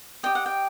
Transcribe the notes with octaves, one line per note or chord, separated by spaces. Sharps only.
G4 D#5 G5
F#5
G5